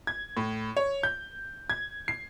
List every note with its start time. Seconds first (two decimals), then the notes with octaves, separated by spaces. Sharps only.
0.07 G#6
0.37 A2
0.77 C#5
1.03 G6
1.70 G#6
2.08 C7